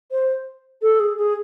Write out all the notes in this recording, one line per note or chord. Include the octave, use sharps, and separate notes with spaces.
C5
A4
G#4
G#4